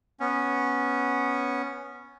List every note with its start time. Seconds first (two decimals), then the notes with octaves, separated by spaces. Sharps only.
0.20 B3 C#4